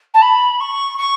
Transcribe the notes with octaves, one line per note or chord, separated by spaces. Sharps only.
A5
B5
C#6
C#6